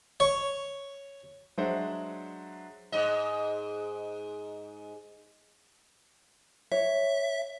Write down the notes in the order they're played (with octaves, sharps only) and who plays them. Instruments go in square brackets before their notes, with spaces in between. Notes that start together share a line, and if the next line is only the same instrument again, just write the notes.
[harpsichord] C#5
[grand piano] F#3 G#3 D4 C5 E5 F#5
[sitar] G#2 D#5
[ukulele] C#5 [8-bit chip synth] E5